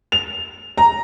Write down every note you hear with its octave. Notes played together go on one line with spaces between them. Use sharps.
F7
A#5